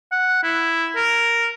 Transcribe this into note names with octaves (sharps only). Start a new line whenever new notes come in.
F#5
E4
A#4